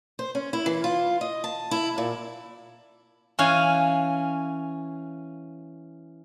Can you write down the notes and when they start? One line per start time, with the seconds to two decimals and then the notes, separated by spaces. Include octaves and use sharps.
0.19 C5
0.35 C#4
0.53 E4
0.66 E3
0.84 F4
1.21 D#5
1.44 A5
1.71 E4
1.98 A#2
3.39 E3 C#4 F5 G#5